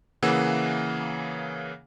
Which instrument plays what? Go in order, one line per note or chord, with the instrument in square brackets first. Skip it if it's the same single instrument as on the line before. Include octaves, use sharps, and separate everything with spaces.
[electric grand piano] C#3 E3 A#3 G#4 F#5 E6